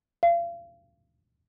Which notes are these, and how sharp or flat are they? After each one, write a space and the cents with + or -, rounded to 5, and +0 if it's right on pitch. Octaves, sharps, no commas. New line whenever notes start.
F5 -35